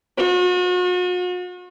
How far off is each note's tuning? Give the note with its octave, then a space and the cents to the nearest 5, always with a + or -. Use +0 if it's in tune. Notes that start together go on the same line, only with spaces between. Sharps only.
F#4 -40